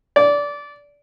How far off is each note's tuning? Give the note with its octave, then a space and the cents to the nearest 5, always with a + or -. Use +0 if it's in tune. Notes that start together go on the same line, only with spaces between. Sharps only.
D5 -20